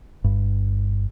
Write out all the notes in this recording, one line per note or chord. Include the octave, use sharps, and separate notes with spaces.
G1 G2